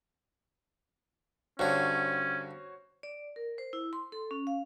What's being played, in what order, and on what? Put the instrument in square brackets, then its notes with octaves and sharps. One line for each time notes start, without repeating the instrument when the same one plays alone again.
[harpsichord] G2 D3 [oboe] C#4 [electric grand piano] F#4 C5 C#5
[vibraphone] D5
A#4
C5
E4
C6
A4
C#4
F5